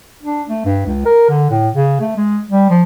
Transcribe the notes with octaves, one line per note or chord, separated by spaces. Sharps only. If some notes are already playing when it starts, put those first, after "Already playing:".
D4
A3
G2
C#2
A#4
D3
A2
C#3
A3
G#3
G3
F3